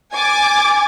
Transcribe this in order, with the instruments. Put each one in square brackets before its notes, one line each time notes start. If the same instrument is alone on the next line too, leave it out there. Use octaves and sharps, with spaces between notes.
[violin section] G#5 D6 A6